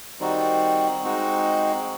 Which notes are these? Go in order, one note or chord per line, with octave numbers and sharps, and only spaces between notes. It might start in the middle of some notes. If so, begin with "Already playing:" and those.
D#3 G3 C4 D#4 F#4
G#3 C4 D#4 F#4